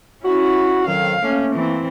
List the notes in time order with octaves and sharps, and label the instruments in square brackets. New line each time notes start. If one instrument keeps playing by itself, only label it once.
[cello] C#4 E4 [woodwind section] F#4
[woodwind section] F2 D#3 F#3 [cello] F5
[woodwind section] A3 A#3 [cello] C#4
[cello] E3 C4